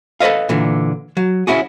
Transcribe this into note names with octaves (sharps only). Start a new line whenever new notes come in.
A4 B4 C5 D#5 F5
A#2 D3 E3
F#3
C#4 D4 E4 F#4 G#4